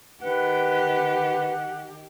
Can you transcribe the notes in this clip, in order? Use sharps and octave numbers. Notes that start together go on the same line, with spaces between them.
D#3 G4 B4 F#5